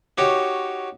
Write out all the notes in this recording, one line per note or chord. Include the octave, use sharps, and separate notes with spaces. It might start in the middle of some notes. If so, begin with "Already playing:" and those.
D#4 F#4 G4 C#5